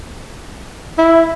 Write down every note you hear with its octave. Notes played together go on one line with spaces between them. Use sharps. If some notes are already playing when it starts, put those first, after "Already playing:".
E4